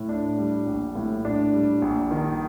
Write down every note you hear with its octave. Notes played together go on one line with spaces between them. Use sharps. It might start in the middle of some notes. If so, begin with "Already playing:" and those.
Already playing: A2
D4
G3
A#1
A2
D4
G3
A#1
D#3